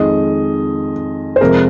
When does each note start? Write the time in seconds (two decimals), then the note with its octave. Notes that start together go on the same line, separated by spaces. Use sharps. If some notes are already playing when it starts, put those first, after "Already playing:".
Already playing: F2 D#3 G#3 D#5
1.36 C5
1.41 F2 C3 F3 G#3 A#4